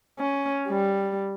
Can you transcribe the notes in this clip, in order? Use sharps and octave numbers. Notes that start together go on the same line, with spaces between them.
C#4
G3